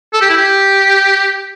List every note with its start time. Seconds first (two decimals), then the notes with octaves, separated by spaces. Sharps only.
0.13 A4
0.21 G4
0.30 E4
0.37 G4